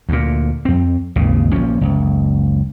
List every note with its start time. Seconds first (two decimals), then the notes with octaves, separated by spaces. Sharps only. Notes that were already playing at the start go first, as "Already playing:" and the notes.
0.09 D2 A#2
0.65 F2 C4
1.16 G#1 D#2 C#3
1.52 A#1 A#2 F3 C#4
1.81 F#1 C#2